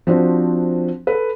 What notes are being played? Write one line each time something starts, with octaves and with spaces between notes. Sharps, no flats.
F3 C4 D4 F#4
A4 B4